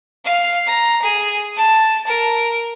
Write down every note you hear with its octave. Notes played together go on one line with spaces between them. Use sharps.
F5
A#5
G#4
A5
A#4